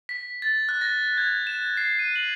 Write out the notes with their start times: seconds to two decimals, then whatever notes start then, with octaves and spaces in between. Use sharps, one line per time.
0.09 B6
0.42 A6
0.69 F#6
0.81 A#6
1.18 G#6
1.47 E7
1.77 C7
1.99 D#7
2.16 F#7